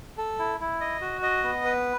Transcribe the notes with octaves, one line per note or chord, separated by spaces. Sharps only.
A4
E4
E4
D#5
F#4
D#5
B3
B4